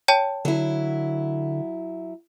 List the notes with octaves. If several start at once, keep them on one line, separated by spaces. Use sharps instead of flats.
C#5 G5 A5
D3 F#3 E4